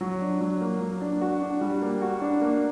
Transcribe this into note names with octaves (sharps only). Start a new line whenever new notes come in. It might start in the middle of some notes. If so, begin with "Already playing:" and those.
F#3
D4
F#3
A#3
F#3
D4
F#4
D4
G3
A#3
F#4
D4
A#3